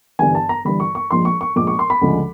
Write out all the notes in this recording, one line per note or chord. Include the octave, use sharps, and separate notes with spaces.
G1 G2 E3 G#5
A5
A#5
G1 G2 E3 B5
C#6
C#6
A#1 A#2 F3 G#3 C6
C#6
C#6
A#1 A#2 F3 G#3 D6
C#6
C6
B5
D2 C#3 F3 G#3